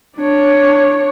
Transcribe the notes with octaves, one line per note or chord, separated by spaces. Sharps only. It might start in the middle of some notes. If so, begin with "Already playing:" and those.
D4 C#5